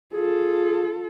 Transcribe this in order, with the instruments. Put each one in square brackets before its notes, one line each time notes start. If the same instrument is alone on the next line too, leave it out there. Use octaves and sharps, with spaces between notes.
[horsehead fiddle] F4 A4 [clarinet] G#4